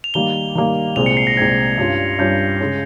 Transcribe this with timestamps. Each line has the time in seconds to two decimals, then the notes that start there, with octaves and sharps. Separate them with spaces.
0.04 F7
0.14 D#3 G3 A#3 G7
0.55 D#3 G3 A#3
0.96 C2 A#2 G#3 C4 F7
1.06 C#7
1.17 C7
1.27 A#6
1.37 C2 A#2 G#3 C4 G#6
1.78 G2 G3 C#4 F4
2.19 G2 G3 C#4 F4 G6
2.60 C#3 G#3 C#4